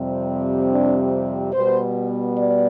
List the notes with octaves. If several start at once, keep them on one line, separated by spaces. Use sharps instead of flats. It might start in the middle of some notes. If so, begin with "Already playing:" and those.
Already playing: F2 C3 G3 C4
D4
B2 G3 B3 C5
D5